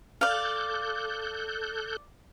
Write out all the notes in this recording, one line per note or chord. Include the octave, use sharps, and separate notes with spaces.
A4 D5 F5 F#6 G6